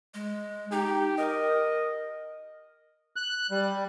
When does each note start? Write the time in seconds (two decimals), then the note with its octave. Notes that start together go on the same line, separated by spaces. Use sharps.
0.14 G#3
0.71 D#4 G4
1.18 A#4 D#5
3.16 F#6
3.51 G3